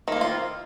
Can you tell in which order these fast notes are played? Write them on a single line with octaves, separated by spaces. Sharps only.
D#3 A#3 C4 F4